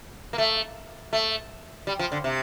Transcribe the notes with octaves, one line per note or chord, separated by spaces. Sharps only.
A#3
A3
A3
G3
F3
D3
C3